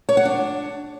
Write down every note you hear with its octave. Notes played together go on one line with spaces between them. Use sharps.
C#5
F#5
D4